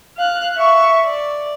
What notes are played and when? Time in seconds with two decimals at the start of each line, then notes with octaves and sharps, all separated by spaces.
0.17 F5 F#6
0.57 E5 C#6
1.05 D5